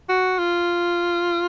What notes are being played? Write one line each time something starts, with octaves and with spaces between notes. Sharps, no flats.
F#4
F4